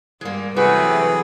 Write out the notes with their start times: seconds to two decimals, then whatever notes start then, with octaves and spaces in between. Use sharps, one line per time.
0.21 G2 G3 G#3 A#3
0.56 C3 E3 F#3 A3 F#4 G#4 B4